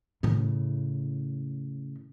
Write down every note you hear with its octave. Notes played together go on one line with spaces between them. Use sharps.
A2 C#3